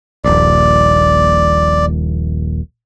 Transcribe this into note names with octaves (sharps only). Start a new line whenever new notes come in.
D#1 A#1 D5